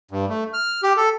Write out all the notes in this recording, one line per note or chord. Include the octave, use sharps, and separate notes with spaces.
G2
A3
F6
G4
A4